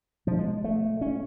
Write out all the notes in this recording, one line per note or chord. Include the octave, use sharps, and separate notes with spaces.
B2 F3
G#3
A3
C#4